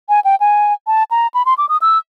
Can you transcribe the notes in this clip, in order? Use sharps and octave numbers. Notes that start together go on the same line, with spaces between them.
G#5
G5
G#5
A5
A#5
B5
C6
D6
D#6
E6